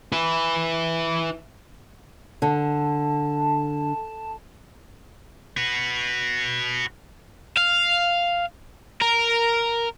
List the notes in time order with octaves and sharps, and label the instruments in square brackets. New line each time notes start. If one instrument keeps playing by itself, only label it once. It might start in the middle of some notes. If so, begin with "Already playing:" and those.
[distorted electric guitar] E4 B4
[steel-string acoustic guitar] D3 [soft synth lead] A5
[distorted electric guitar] F#4 B4
[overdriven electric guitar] F5
A#4